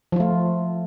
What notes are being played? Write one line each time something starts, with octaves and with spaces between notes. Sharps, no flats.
F3 A3 F4